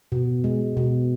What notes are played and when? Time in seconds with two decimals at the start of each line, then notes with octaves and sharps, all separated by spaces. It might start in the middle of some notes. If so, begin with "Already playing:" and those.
0.12 B2
0.44 G#3
0.77 B2